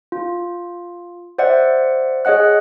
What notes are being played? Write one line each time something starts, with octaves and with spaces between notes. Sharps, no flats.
F4
C5 D5 E5 F#5
G#4 C#5 D#5 F#5 F#6